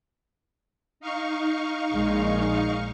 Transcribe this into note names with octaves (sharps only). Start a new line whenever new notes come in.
D#4 F5 C#6
A#1 G#3